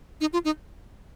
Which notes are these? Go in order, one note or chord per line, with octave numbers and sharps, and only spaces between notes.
D#4
F4
D#4